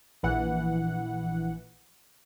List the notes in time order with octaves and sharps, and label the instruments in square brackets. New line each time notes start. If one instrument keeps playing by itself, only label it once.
[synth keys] A#1 E3 F#5